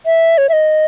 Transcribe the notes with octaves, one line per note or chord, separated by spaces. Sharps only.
E5
C#5
E5
D#5